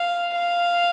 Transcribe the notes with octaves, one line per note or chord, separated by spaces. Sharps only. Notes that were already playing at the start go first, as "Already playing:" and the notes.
Already playing: F5
F5